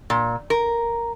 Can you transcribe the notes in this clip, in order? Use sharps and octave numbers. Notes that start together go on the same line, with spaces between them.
A#2
A#4